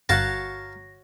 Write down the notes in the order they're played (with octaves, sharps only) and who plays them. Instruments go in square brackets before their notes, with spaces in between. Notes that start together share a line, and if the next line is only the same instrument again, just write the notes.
[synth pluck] G1 [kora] F#4 C#5 F#5 [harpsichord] A#4 F5 A5 [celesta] A#6